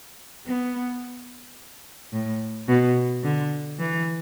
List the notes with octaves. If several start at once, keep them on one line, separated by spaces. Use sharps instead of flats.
B3
A2
B2
D3
E3